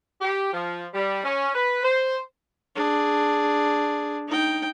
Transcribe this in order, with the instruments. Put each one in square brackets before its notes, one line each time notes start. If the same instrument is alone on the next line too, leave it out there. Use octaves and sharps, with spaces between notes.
[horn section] G4
F3
G3
C#4
B4
C5
[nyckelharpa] D4 G#4
D#4 G5